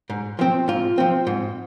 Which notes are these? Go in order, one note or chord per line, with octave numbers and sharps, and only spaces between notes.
G#2
F3 C4
G#2 F4
F3 C4
G#2